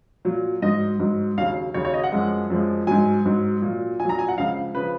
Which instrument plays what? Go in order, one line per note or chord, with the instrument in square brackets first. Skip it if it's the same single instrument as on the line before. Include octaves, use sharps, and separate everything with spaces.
[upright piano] A#2 F#3
G#2 F#3 D#5
G#2 F#3
D#2 C#3 F#3 F5
D#2 C#3 F#3 C#5
C#5
D#5
F#5
F#2 F3 G#3
F#2 F3 G#3
G#2 F#3 G#5
G#2 F#3
A#2 F#3
A#2 G#5
F#3 A#5
G#5
F#5
C#2 C#3 F3 F5
C#3 F3 B4